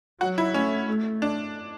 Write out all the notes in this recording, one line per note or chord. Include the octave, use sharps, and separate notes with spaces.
F#3 F#4
E4
A3 C#4
A3
D4